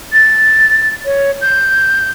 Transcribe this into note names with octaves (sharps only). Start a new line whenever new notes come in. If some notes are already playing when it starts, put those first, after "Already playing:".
A6
C#5
G6